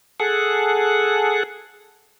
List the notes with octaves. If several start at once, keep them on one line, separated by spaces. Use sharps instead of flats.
G#4 A4 F#5